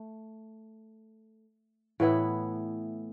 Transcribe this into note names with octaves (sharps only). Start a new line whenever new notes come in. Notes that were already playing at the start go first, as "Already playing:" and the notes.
Already playing: A3
A2 E3 B3 E4